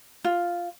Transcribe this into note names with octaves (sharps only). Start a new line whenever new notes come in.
F4